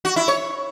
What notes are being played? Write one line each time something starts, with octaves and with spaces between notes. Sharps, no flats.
F#4
E4
C#5